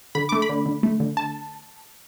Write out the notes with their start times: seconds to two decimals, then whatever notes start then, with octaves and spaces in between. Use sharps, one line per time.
0.15 D3 B5
0.29 A3 D6
0.42 B5
0.49 D3
0.66 D3
0.83 A3
1.00 D3
1.17 A5